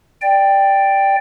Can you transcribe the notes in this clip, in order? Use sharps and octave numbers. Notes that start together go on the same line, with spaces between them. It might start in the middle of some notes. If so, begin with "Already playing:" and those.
D5 G5